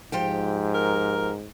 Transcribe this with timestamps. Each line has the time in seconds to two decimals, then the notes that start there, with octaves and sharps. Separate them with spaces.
0.12 G#2 F3 G4 G5
0.74 A#4